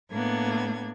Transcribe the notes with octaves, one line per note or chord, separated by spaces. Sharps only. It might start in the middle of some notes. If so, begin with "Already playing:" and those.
A2 A#3 B3 D4 G#6